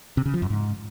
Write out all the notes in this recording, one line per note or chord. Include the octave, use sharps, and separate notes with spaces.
C3
C#3
F3
F#2
G#2